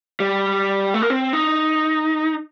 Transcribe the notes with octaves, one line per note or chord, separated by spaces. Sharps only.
G3
A3
A#3
C4
D#4